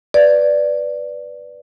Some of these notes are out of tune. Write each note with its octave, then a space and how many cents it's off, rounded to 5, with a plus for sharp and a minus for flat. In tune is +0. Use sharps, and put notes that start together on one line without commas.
B4 +0 D5 +0